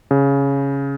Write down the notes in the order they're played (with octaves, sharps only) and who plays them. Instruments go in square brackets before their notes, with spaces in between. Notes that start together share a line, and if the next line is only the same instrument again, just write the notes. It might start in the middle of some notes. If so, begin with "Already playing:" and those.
[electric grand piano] C#3